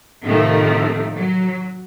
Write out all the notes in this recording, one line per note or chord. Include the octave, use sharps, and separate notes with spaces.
A2 C3 D#3 F3 A3
F#3